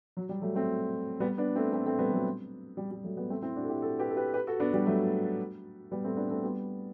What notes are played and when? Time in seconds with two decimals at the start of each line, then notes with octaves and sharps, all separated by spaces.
0.17 F#3
0.29 G3
0.42 F#3 A3
0.55 A3 C4
1.20 G3 B3
1.38 B3 D4
1.55 A3 C4
1.72 A3 C4
1.86 A3 C4
1.99 G3 B3
2.11 F#3 A3
2.77 G3
2.91 G3
3.04 F#3 A3
3.17 G3 B3
3.30 A3 C4
3.42 C4 E4
3.56 D4 F#4
3.63 A4
3.69 E4 G4
3.82 F#4 A4
3.99 G4 B4
4.10 A4
4.16 G4 B4
4.34 G4 B4
4.47 F#4 A4
4.60 B3 D4
4.73 G3 B3
4.86 F#3 A3
5.91 G3 B3
6.04 A3 C4
6.17 B3 D4
6.30 A3 C4
6.43 G3 B3